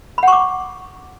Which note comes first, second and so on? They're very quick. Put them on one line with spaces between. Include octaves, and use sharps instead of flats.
B5 F#5 C#6 D6